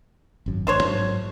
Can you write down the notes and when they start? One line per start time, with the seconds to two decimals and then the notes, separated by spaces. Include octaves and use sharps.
0.46 G#1 F#2
0.67 A1 D4 C5 C#5
0.84 G#2 F#3